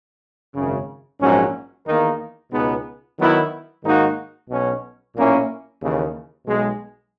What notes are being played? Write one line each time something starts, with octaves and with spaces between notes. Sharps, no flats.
G#1 F#2 C#3
A#1 G#2 F#3 C#4
E2 D#3 A#3 D#4 A#4
C#2 B2 G#3 B3 D#4
D#3 F#3 B3 E4
G#2 D#3 A#3 D#4 F#4
B1 B2 F#3 C#4
B1 A#2 A#3 C#4 E4
D#2 C#3 E3
B1 B2 G#3